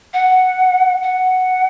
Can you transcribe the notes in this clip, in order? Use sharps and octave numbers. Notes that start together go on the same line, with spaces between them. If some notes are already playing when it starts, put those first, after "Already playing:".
F#5
F#5